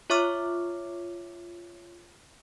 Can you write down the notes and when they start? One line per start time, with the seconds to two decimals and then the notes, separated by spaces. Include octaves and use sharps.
0.10 F4 C#5 E5 C#6 D6 F6